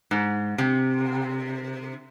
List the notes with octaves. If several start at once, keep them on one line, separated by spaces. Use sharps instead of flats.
G#2
C3